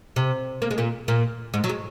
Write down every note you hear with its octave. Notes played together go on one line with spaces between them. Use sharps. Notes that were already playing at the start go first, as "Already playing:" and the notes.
C3
A#3
G#3
A#2 A#3
A#2 A#3
G#2 G#3
F#3
G#3